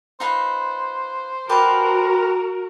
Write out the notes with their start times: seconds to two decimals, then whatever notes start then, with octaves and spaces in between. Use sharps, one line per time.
0.20 D#4 F4 B4 C5
1.49 F#4 G4 A#4 B4 A5